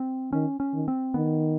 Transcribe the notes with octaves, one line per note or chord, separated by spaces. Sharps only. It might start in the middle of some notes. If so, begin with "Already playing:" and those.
Already playing: C4
D#3 C#4
C#4
D#3
C4
D#3 B3